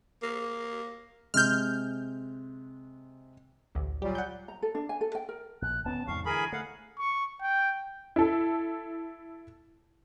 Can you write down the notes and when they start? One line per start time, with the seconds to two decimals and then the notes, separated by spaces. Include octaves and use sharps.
0.23 A#3
1.34 C3 G#3 F6 G6
3.75 A1 D2
4.02 A#2 F#3 G3 G4
4.15 F#5 G6
4.48 A#5
4.62 A4
4.75 D4
4.89 G#5
5.01 A4
5.15 G5
5.29 A#4
5.62 A#1 F#6
5.85 D1 B3 C#4 A5
6.07 E2 G#2 C3 F5 C#6
6.26 D3 E3 G#4 A#4 G#5 B5
6.52 A3 F5 F#5
6.99 C#6
7.41 G5
8.16 E4 A4